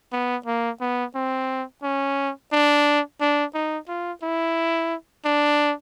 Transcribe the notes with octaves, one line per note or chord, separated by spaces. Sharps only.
B3
A#3
B3
C4
C#4
D4
D4
D#4
F4
E4
D4